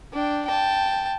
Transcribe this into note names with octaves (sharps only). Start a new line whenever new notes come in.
D4 G5
G5 A5